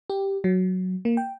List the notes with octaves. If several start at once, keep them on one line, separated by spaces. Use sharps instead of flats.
G4
F#3
A#3
G5